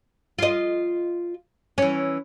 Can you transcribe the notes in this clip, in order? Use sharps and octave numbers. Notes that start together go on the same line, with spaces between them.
F4 D#5
E3 C#4